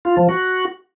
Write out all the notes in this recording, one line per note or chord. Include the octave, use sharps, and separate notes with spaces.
F4
F3
F#4